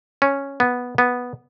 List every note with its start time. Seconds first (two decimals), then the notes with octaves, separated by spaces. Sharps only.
0.22 C#4
0.60 B3
0.98 B3